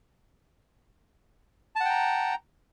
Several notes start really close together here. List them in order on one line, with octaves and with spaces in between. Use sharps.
A5 F#5 G5 A#5